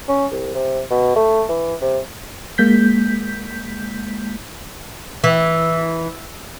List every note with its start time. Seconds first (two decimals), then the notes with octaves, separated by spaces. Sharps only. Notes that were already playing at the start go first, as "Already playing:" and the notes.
0.09 C#4
0.32 C2
0.55 C3
0.91 B2
1.16 A3
1.49 E3
1.82 C3
2.58 G#3 A#3 G6 B6
5.24 E3